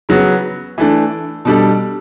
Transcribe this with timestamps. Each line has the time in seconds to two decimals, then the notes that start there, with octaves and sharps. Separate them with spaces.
0.09 C#3 F#3 B3
0.78 E3 A3 D4
1.45 B2 G3 D4 A4